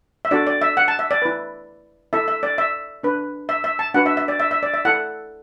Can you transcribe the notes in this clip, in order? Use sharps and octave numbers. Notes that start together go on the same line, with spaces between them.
E5
D4 F#4 A4 D5
D5
E5
F#5
A5
E5
D5
E4 B4
E4 A4 E5
E5
D5
E5
D4 B4
E5
E5
A5
D4 F#4 B4 F#5
E5
E5
D5
E5
E5
D5
E5
E4 A4 F#5